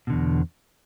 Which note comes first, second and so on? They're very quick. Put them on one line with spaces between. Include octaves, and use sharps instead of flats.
B2 D3 E2